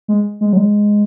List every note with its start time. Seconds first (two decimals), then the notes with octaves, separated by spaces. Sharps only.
0.08 G#3
0.41 G#3
0.53 F#3
0.57 G#3